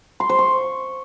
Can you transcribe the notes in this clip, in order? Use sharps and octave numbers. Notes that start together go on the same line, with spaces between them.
C6
C5
C#6